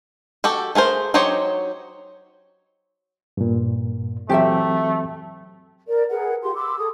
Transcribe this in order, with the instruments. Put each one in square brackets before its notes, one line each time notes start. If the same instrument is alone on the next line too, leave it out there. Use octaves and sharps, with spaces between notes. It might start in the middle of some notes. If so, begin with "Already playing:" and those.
[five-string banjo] F#4 G4 A4
A3 G#4 A#4 C5
F#3 D#4 G4 C5 C#5
[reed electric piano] G2 A#2
[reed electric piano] E3 F#3 C4 [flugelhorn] A3 [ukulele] G4 A4 E5
[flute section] A#4 D5
G#4 A#4 B4 F#5
F4 G4 C6
B5 C6 D6 E6
G#4 A4 D#6